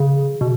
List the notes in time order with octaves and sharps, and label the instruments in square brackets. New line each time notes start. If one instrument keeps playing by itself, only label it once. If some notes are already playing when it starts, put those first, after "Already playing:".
Already playing: [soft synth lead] C#3
B2